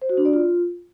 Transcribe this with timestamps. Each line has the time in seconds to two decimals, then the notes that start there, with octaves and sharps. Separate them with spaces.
0.02 C5
0.09 F#4
0.17 D4
0.25 D5
0.33 F4